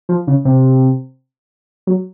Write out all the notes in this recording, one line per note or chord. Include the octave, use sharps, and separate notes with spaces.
F3
C#3
C3
F#3